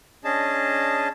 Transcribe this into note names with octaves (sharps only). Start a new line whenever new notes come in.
C#4 D4 G#4 D#5 A5